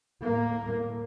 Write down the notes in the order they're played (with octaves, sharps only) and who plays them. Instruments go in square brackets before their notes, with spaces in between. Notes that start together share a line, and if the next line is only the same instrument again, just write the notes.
[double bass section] A2 A#3